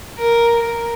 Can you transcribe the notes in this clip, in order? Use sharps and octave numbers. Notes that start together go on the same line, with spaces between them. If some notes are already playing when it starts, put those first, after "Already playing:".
A#4
A#4